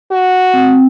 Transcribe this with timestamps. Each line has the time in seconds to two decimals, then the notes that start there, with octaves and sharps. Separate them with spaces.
0.11 F#4
0.54 C4